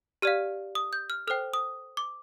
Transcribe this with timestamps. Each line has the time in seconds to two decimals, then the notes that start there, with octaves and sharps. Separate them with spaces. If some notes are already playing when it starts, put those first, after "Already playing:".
0.22 G4 D5 F5 F6
0.75 D#6
0.93 G6
1.10 F6
1.27 A4 C5 G5 F6
1.54 D#6
1.97 D6